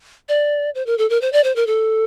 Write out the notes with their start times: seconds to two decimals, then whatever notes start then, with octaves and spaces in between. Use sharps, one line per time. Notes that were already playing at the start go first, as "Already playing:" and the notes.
0.29 D5
0.75 C5
0.86 A#4
0.98 A4
1.10 A#4
1.21 C5
1.32 D5
1.44 C5
1.56 A#4
1.67 A4